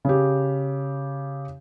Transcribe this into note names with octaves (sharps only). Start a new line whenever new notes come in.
C#3 G4